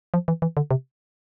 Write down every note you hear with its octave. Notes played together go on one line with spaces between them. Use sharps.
F3
E3
E3
D3
C3